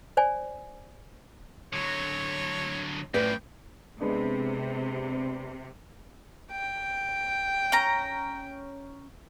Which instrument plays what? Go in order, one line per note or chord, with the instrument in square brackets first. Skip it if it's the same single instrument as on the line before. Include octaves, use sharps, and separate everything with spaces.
[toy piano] C5 D5 G#5
[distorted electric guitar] D3 F#3 [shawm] C#5
[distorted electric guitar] F#2 F3 [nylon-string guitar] A2 B4 D5 [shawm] G5
[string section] C3 [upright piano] G#3 B3 D4
[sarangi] G5
[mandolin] C#4 A#5